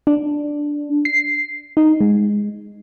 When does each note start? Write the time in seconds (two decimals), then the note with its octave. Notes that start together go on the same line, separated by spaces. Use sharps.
0.07 D4
1.05 C7
1.77 D#4
2.01 G#3